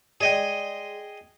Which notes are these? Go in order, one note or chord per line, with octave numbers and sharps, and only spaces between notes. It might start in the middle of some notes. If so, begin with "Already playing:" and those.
G#3 G#4 D5 D#5 G5